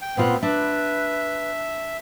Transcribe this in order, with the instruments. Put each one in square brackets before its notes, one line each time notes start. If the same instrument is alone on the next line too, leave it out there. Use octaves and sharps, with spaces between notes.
[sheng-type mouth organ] G5
[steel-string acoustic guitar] A#2 F4 F#5 [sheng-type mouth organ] B3 C4
[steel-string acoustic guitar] D4 [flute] B4 [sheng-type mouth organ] E5